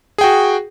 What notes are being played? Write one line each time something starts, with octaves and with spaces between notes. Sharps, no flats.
F#4 G#4 G5